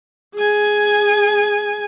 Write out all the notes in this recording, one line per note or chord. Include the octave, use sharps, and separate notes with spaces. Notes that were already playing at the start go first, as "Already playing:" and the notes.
G#4 G#5